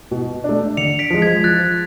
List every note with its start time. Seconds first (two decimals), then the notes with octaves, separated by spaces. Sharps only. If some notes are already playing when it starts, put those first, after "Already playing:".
0.11 B2
0.44 A3 D4
0.77 D3 C#7 F7
0.99 B6 D7
1.10 F3 G#3
1.22 G#6 B6
1.44 F3 F#6 A6